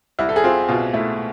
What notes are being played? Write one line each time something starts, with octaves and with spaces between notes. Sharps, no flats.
C2 E4
A4
G#4
C4 F4
B2 F4
A3 E4